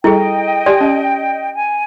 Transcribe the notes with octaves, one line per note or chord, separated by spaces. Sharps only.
G3 E4 G#4 A4 D#5 G5
G4 D5 G#5 C6
C#4
G#5